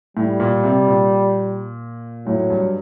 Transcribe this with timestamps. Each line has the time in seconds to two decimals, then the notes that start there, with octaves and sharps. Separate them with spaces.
0.17 A2 G3
0.40 A#2
0.64 C3
0.87 A#2
2.26 A2 F#3
2.50 G2